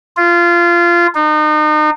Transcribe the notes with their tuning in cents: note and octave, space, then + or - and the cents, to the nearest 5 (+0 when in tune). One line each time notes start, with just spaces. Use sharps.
F4 -20
D#4 -35